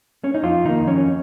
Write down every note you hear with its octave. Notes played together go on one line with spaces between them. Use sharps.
C#4
D#4
F2 F4
D#3 A#3 D#4
F2 C#4